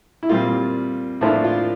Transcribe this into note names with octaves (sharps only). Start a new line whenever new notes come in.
E4
A#2 G3 C4 F4
A2 F3 A#3 D4 E4
F4